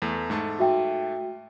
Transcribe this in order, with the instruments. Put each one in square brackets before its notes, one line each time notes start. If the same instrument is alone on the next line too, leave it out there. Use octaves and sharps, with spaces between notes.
[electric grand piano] E2 A3
G#2 A3 A5
[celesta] F#4 E5 G5